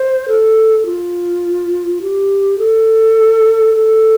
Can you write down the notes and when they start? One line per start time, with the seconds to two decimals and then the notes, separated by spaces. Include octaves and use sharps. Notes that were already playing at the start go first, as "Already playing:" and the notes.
Already playing: C5
0.28 A4
0.86 F4
2.02 G4
2.59 A4
3.75 A4